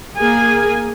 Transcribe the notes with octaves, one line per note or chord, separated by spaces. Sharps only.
A#3 G#4 G#5